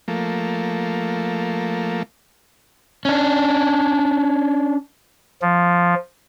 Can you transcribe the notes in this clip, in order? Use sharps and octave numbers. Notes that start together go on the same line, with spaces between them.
F3 A3 A#3
C#4 D4
F3